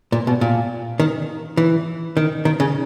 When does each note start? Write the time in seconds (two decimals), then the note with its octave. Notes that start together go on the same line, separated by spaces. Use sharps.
0.12 A#2
0.27 B2
0.41 A#2
1.00 D#3
1.57 E3
2.17 D#3
2.45 D#3
2.60 C#3